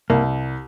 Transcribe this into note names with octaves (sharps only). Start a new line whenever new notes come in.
C2 A#3